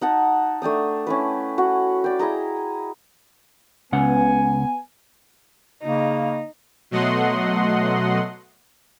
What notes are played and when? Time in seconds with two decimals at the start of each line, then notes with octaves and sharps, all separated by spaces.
0.01 D#4 F#5 A5
0.62 A3 D4 G5 D#6
1.07 C#4 E4 B4
1.58 F#4 F#5
2.04 D5 G5
2.19 E4 G#4 D#5 A#5
3.92 C#2 C#3 B3 F#5 G#5
5.83 C#3 A#3 D#4
6.91 B2 F#3 A3 D#5 F#5 C6